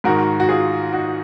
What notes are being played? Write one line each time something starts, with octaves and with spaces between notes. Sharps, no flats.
G#2 D#3 F#4 A#4
F#4
F4 G#4
D#4 F#4